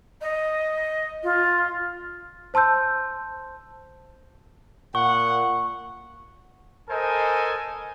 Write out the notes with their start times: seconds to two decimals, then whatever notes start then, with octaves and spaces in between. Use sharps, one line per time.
0.21 D#5
1.23 F4
2.54 C5 A5 C6 E6 G6
4.95 A#2 F#5 C#6
6.89 A4 A#4 C5 D#5 G#5